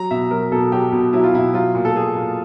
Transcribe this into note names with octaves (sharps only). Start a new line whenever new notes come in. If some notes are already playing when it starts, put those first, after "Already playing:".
Already playing: F#3 A#5
B2 E5
F#3 A#4
B2 A4
F#3 G4
B2
F#3 E4
F4
B2 E4
F#3 F4
A#2
A4
F#3 G#4
A#2